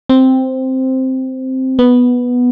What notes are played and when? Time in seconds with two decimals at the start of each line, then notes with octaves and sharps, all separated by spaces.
0.09 C4
1.79 B3